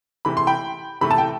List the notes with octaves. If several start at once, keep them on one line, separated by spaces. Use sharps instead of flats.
C3 E3 A3 B5
C6
G5 B5
C3 E3 A3 B5
A5
G5